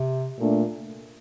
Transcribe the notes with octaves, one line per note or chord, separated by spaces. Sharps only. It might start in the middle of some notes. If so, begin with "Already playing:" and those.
Already playing: C3
A#2 A3 D4